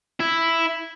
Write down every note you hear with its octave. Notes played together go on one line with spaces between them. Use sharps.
E4